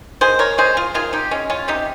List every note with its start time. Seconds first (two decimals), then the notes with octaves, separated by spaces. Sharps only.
0.21 D#3 G#4 C5
0.39 A#4 C#5
0.58 G#3 G#4 C5
0.77 F4 G#4
0.94 D#3 F4 G#4
1.13 D#4 G4
1.31 G#3 C#4
1.50 C#4 F4
1.68 C3 D#4 G4